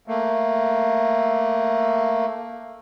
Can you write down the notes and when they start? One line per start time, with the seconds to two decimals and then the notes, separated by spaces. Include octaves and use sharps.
0.08 A3 A#3